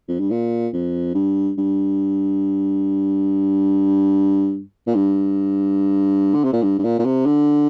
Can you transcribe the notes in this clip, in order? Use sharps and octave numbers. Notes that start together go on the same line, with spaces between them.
F2
G2
A#2
F2
G2
G2
A#2
G2
D3
C3
A#2
G2
G2
A#2
A#2
C3
D3